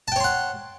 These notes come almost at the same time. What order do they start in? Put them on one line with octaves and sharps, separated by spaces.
A5 G5 C#5 C6 F#5